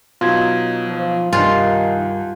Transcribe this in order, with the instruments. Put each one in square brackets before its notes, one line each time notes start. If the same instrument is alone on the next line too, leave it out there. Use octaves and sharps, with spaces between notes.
[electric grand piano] B2 F#3 D#4 [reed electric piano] F4 G#6
[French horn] F3
[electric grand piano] C2 G#5 [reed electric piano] G2 G3 [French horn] D#3 [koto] F4